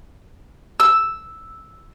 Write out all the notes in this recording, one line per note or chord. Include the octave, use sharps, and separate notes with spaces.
E6